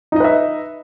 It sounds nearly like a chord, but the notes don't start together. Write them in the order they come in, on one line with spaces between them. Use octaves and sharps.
D#4 D#5 B4 E5